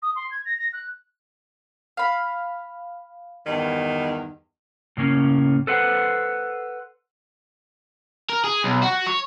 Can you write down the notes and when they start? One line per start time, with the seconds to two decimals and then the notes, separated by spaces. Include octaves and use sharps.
0.03 D#6
0.16 C6
0.31 G#6
0.45 A#6
0.59 A#6
0.73 F#6
1.97 F5 B5
3.46 E2 G2 D#3
4.97 A2 C#3 A#3 C#4
5.67 A4 B4 C5 F#5
8.29 A#4
8.44 G#4
8.64 B1
8.83 F#4
9.06 C#5